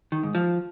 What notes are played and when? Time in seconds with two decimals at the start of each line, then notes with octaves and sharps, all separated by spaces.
0.12 D#3
0.23 G#2
0.35 F3